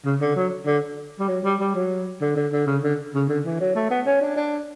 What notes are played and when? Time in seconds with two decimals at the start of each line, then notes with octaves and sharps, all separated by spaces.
0.05 C#3
0.21 D3
0.36 F#3
0.66 D3
1.19 G3
1.28 F#3
1.44 G3
1.60 G3
1.75 F#3
2.21 D3
2.36 D3
2.52 D3
2.67 C#3
2.83 D3
3.14 C#3
3.29 D3
3.45 E3
3.60 F#3
3.75 A3
3.90 B3
4.06 C#4
4.21 D4
4.36 D4